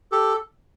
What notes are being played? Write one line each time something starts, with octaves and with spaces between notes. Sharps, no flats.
G4 A4